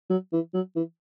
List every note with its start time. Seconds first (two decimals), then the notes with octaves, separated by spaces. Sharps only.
0.10 F#3
0.33 E3
0.54 F#3
0.75 E3